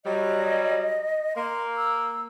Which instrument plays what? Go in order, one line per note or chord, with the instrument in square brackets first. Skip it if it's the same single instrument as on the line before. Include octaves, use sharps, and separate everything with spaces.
[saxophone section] F#3 G3 [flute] D#5
[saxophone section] A#3 [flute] C6
[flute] E6